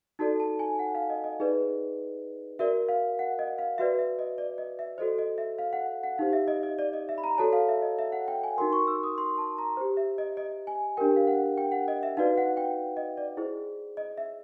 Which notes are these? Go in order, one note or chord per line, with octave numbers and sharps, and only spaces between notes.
D#4 F#4 A4 D5 A5
A5
G#5
F#5
F5
D#5
D#5
D#4 G#4 B4 D5
F#4 A#4 D5 E5
F5
F#5
D#5
F5
F#4 B4 D5 E5
E5
D#5
D5
D#5
E5
F#4 A4 C5 D#5
D#5
E5
F5
F#5
F#5
D#4 G4 C5 F5
E5
D#5
D#5
D5
D#5
E5
B5
A#5
F#4 A4 C#5 A5
F5
E5
D#5
E5
F#5
G5
G#5
D#4 F#4 A#4 C6
C#6
E6
D#6
C6
A5
A#5
G4 C5
E5
D#5
D#5
G#5
D4 G4 A#4 G5
F5
F#5
G5
F#5
D#5
E5
D#4 F#4 B4 D5 F5
F#5
G5
D#5
D5
E4 G#4 C5
D#5
E5